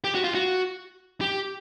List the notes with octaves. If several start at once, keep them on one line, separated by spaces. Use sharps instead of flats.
G4
F#4
F4
F#4
G4